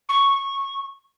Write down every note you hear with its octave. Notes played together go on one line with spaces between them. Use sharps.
C#6